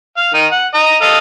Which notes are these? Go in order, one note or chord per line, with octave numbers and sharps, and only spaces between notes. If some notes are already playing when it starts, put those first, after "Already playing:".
F5
D#3 D#4
F#5
D#5 A#5
A4 D#5 F5